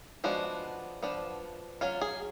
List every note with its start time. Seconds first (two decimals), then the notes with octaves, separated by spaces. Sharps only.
0.24 F3 G#3 B3 D4 F#4
1.02 F3 B3 D4
1.81 F#3 C#4 F4
2.01 G#4